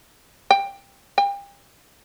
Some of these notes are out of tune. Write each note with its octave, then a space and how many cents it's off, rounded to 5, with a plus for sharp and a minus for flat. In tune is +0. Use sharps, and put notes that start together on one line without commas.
G5 +15
G5 +35